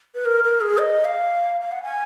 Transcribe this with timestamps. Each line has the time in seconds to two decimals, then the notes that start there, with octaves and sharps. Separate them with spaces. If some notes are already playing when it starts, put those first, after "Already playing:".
0.15 B4
0.25 A#4
0.44 A#4
0.61 G#4
0.78 D#5
1.05 F5
1.61 F5
1.72 F#5
1.83 G#5